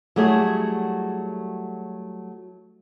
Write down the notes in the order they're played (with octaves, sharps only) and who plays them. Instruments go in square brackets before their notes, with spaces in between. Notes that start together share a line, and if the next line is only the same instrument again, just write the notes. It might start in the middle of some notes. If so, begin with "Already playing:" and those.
[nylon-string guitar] F#3 G3 A3 E4 G#4